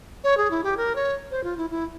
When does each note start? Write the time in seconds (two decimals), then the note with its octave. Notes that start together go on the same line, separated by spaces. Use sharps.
0.24 C#5
0.37 G#4
0.51 E4
0.64 G4
0.77 A#4
0.96 C#5
1.31 C5
1.44 F4
1.57 E4
1.70 E4